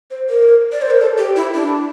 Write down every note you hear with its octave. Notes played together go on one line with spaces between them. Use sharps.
C5
A#4
D5
C5
A#4
A4
G4
E4
D4